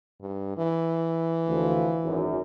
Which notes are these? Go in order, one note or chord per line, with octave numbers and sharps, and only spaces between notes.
G2
E3
D2 F3
G#1 F#2